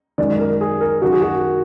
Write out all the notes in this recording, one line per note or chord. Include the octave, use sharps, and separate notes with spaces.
F#2 D#3 G#3 D5
A#4
G#4
A#4
F#2 D#3 F#3 F#4
G#4
F#4